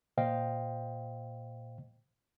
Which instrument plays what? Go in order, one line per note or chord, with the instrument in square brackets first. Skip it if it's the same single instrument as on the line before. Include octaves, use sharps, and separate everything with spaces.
[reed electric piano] A#2 C5 D#5 F5 G5